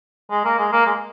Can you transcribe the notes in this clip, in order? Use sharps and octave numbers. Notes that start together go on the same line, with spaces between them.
G#3
A#3
G#3
A#3
G#3